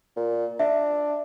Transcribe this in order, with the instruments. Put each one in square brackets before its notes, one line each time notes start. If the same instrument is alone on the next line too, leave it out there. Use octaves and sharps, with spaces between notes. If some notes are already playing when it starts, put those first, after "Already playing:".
[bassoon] A#2
[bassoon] D4 [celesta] E5